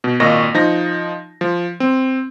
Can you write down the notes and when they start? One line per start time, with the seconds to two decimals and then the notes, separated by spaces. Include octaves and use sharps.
0.04 B2
0.20 G#1 A#2 A#3 D#5 C#6 A#6
0.54 F3 D#4 A#6
1.41 F3
1.80 C4